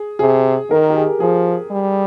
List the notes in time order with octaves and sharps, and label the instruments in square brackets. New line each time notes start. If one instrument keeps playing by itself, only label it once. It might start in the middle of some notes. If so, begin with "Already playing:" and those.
Already playing: [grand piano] G#4
[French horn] C3 [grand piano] G#4
[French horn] D#3 [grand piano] A#4
[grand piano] G4
G#4
[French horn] F3 [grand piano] G#4
[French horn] G3